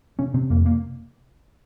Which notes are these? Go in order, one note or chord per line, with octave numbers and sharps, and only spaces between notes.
C3 C#4
C3 C4
F2 A#3
A#3